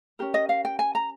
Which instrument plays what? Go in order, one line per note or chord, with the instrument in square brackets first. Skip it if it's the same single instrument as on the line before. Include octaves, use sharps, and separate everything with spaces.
[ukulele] C#4 G4 A#4
D#5
F5
G5
G#5
A#5